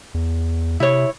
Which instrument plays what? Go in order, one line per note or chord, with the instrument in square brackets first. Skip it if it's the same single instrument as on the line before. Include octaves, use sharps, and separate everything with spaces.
[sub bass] E2
[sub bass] C3 [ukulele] E4 C#5